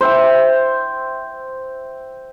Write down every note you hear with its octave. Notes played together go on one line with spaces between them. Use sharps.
C5 E5 G5